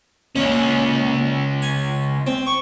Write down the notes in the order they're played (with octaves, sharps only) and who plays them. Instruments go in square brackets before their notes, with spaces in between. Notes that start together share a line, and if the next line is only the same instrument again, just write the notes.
[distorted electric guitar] C#2 C#4 [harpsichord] A#2
[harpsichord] G#5
C4
C#6